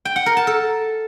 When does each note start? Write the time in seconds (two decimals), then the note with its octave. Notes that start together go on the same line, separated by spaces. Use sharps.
0.05 G5
0.16 F#5
0.26 A#4
0.37 A5
0.47 A4